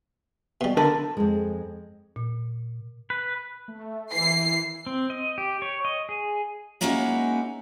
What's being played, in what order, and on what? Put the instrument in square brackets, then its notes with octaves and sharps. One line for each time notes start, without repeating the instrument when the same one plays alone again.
[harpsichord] B2 G3
[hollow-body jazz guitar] D3 A#4 B4 [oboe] A5
[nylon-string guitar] F2 G#3
[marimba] A#2
[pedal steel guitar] B4
[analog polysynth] A3
[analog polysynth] E3 E4 [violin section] C7
[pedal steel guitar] C4
D#5
G4
C#5
D#5
G#4
[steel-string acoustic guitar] G#3 A#3 C#4 D#4 E4 F#4